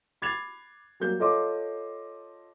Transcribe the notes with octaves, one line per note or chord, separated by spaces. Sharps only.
B5 D6 G#6 A6 C7 F7
F#3 G3 A#3 G6 G7
F4 A4 C#5 D#5 C6 D6